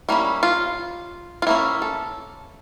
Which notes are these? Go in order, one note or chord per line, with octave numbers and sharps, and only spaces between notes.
G3 A#3 C#4 E4
F4
F4
E3 A#3 C#4 E4
A4